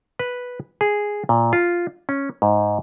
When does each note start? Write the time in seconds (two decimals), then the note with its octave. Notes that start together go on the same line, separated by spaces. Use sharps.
0.19 B4
0.81 G#4
1.29 A#2
1.53 F4
2.09 C#4
2.42 G#2